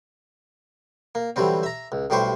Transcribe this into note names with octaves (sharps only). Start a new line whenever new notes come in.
A#3
D3 E3 F#3 G3 C4
E5 A#5
C#2
B1 A2 G3 G4 C5 C#6